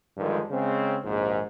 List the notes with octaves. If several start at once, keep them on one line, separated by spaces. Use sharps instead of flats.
G2 D3 D#3 F3 G#3
C#3 G#3 C4
A#1 D#2 G#2